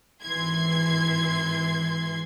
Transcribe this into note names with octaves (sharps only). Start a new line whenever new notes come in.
G#1 E3 C6 G#6